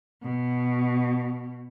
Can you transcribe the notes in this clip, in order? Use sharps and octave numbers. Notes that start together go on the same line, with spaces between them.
B2